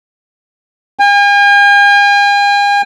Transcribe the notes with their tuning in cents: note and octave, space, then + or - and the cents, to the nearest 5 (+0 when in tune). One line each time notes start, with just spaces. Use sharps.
G#5 -45